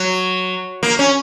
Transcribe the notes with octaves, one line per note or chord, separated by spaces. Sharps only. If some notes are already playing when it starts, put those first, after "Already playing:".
Already playing: F#3
A#3
C#4